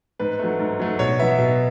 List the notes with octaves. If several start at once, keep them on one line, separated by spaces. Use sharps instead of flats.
G#2 B4
F#3 A3
G#2
F#3 A3
B2 C#5
F#3 B3 E5
B2